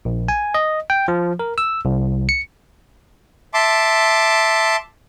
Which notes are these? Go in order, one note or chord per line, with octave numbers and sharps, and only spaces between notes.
A#1
G#5
D#5
G5
F3
A#4
E6
C2
C#7
E5 A5 C6 D6